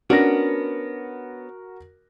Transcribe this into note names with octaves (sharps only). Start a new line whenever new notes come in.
B3 C#4 D4 F#4 A#4 A#6